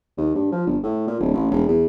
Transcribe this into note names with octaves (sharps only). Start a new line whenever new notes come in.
D#2
G2
F3
G1
A2
A#2
D1
A1
E1
E2